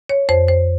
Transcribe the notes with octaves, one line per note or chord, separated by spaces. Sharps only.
C#5
F2 C5
C5